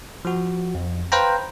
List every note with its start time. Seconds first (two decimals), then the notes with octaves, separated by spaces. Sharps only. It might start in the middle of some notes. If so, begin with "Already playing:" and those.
0.25 F3 F#4
0.75 F2
1.12 B4 C5 F5 G5 A#5